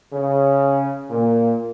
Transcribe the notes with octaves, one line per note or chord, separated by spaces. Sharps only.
C#3
A#2